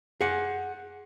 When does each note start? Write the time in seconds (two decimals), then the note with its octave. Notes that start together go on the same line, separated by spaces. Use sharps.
0.21 G#4 F#5